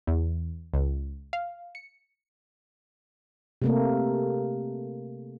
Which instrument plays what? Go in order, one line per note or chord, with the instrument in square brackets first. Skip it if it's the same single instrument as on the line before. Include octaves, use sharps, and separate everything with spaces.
[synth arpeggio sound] E2
C#2
F5
C#7
[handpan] C3 A3 A#3